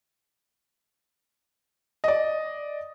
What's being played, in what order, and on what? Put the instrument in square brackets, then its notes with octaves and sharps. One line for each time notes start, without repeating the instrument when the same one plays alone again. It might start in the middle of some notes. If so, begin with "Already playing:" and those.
[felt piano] D5 D#5